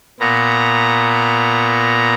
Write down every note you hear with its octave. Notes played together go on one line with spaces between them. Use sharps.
A#2 B3 A#5